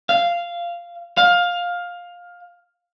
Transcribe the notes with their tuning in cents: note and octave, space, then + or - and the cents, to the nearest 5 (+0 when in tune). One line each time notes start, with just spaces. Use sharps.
F5 -10
F5 +15